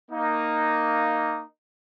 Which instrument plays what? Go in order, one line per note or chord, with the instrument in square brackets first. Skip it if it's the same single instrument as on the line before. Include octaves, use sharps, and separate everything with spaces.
[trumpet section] A#3 D#4